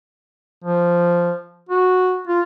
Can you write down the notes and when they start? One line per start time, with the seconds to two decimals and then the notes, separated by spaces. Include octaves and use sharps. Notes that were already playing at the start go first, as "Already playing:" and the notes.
0.64 F3
1.69 F#4
2.27 F4